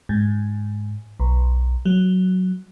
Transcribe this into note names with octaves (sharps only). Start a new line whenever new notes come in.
G#2
B1
F#3